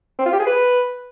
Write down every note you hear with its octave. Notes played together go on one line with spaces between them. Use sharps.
C4
F4
G4
G#4
B4